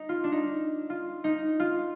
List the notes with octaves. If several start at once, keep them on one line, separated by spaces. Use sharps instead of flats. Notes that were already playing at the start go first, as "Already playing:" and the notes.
Already playing: D#4
F4
D4
D#4
F4
D#4
F4